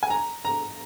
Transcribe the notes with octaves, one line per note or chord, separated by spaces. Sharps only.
G#5
A#5
A#5